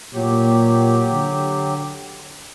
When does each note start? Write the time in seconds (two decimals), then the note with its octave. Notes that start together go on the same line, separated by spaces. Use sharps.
0.14 A#2 F#3 G4
1.12 D3